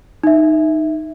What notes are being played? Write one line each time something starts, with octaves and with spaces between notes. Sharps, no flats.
D#4 E5